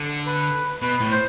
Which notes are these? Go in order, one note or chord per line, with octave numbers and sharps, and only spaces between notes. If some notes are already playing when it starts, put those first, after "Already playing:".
Already playing: D3
B4
B2 B4
A2
C5